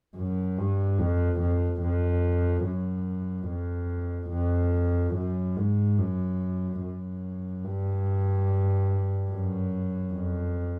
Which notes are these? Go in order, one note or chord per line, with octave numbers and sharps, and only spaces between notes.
F#2
G2
F2
F2
F2
F#2
F2
F2
F#2
G#2
F#2
F#2
G2
F#2
F2